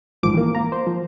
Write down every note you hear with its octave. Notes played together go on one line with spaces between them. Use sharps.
A#1 G#2 D#3 F3 D6 D7
E3 A#3
A#3 A#5
C5
F3